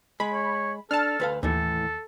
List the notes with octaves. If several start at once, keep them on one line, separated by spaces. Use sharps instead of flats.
G#3 B5
C#5
D4 A4 A5 F6
D2 B4 F5
D#2 A2 E3 A4